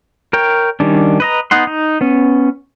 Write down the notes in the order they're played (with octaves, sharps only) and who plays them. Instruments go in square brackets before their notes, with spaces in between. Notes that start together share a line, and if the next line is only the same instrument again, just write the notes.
[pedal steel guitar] A#4 C#5 G5
D#3 G3 C#4 D4
B4 D#5 A#5
B3 D#4 F#5 C6
D#4
B3 C#4